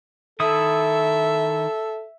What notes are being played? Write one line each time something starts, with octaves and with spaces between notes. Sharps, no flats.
D#3 E4 A4 E5 D#6